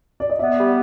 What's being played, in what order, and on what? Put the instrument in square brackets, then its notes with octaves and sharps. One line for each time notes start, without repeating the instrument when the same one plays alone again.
[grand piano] D5
D#5
[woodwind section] B3 [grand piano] D5 E5
[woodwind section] G3